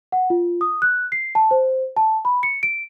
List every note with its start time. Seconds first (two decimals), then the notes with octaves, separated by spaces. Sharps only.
0.12 F#5
0.30 F4
0.61 D#6
0.82 F#6
1.12 C7
1.35 A5
1.51 C5
1.97 A5
2.25 B5
2.43 C#7
2.63 D7